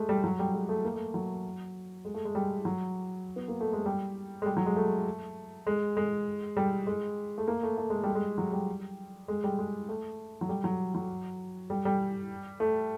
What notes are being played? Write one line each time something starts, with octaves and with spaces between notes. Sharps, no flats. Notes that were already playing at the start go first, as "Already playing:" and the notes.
Already playing: G#3 A3
G3
F#3
G3
G#3
A3
A#3
A3
F#3
G#3
A3
G#3
G3
F#3
B3
A#3
A3
G#3
G3
G#3
G3
F#3
G#3
A3
G#3
G#3
G3
G#3
A3
A#3
A3
A3
G#3
G3
G#3
F#3
G3
G#3
G3
G#3
A3
F#3
G3
F#3
F#3
G3
G3
A3